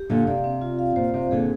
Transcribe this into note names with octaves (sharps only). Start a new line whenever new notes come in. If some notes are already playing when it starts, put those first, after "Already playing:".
Already playing: G4
A#2 D3 F5
C3 D5
C4
F4
F5
A#2 C5
C3 C4
A#2 D3 G#4